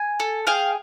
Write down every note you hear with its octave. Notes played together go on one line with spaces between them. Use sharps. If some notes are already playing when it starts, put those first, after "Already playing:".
Already playing: G#5
A4
G#4 F5 G5